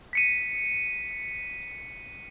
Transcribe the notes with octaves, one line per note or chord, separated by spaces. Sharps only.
B6 C#7 D#7